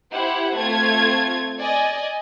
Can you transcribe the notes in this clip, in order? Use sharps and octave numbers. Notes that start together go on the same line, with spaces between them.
E4 G4 C5 F#5
A3 C4 F4 G#6
D5 D#5 G#5